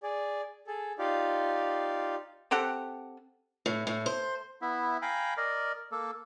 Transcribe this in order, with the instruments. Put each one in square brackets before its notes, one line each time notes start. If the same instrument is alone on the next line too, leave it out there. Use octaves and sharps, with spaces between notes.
[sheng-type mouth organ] G#4 D5
G#4 A4
D#4 F4 G4 D5 F5
[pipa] C4 G4 A4 F#5
[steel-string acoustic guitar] A2
A2
C5
[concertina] B3 E4 E5
F5 G5 G#5 A#5 B5
A#4 D5 D#5
A#3 A4